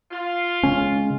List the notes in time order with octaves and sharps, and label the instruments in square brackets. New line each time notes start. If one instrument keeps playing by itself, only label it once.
[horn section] F4
[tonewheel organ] C#3 G#3 [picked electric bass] C#4